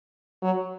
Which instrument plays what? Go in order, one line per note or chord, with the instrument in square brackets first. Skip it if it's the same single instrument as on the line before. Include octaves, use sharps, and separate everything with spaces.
[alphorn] F#3